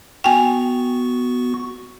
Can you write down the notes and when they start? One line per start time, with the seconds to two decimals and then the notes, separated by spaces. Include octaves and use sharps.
0.24 B3 F#4 G5 G#5 C#6